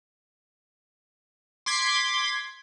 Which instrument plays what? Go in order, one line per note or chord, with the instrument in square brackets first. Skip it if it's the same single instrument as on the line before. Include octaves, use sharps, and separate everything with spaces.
[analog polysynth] C6 D6 G#6 B6